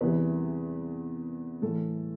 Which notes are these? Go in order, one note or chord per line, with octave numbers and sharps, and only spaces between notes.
E2 C3 E3 B4
A2 E3 A4